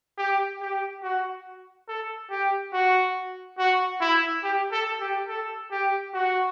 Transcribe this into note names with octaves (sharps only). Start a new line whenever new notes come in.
G4
G4
F#4
A4
G4
F#4
F#4
E4
G4
A4
G4
A4
G4
F#4